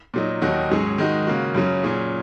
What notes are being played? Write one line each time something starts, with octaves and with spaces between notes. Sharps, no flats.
A#2 F#3 D#4
D#2 D#3 F#3 D#4 F#4
G#2 F#3 C#4 G#4
D#3 G#3 D#4 F#4
C#3 A#3 F#4
F#2 C#3 F#3 C#4
A#2 F#3 C#4 G#4